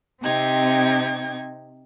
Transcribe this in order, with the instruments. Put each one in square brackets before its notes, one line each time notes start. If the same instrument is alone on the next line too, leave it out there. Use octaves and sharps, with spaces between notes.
[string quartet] C3 C4 D#4 G4 G#6